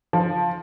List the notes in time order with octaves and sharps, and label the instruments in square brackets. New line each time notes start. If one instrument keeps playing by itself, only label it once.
[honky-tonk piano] F3